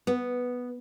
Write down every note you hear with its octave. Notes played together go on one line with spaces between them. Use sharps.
B3